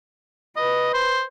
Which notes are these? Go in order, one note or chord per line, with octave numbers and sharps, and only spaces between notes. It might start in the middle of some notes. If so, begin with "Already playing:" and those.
B4 D#5
C5